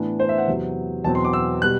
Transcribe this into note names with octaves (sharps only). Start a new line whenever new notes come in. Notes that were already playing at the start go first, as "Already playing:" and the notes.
Already playing: A2 E3 B3 D4
C5
E5
F#5
E2 C3 F#3
E2 B2 F#3 C4 A5
C6
D6
E6
B2 G3 F#6